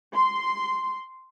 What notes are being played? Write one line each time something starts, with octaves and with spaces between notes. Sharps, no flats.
C6